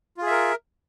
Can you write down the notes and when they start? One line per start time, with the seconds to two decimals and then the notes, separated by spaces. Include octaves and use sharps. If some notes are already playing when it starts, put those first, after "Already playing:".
0.17 F4
0.22 G#4
0.27 E5
0.31 A#4